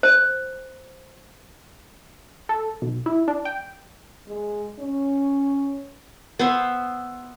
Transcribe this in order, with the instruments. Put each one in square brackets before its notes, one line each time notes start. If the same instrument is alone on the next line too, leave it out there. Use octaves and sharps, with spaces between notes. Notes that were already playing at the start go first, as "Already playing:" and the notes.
[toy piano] C5
[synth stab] A4
B1
E4
D4
G5
[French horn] G#3
C#4
[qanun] B3 C5 E5